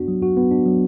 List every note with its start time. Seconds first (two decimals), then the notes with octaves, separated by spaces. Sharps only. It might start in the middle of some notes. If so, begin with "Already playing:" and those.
Already playing: B3 D4 F#4
0.08 F#3
0.23 F#4
0.37 B3
0.51 D4
0.66 F#3